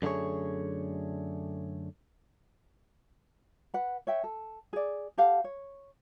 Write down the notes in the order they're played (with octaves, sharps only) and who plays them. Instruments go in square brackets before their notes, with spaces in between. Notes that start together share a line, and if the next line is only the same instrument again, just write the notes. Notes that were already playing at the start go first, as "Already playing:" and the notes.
[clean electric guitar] F#2 D3 A3 F4 G#4 C#5
[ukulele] B4 F#5
C#5 E5 G5
A4
G#4 D5
G4 A4 F5 F#5
C#5